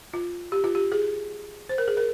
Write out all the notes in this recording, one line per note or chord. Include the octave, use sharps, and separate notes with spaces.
F4
G4
F4
G4
G#4
C5
A#4
G#4
A#4